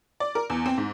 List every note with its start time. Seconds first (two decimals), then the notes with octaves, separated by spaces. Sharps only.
0.20 D5
0.35 A#4
0.50 E2
0.66 C4
0.78 G#2